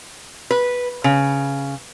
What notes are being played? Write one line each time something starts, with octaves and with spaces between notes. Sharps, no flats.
B4
C#3